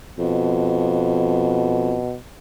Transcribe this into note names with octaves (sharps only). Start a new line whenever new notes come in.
F2 B2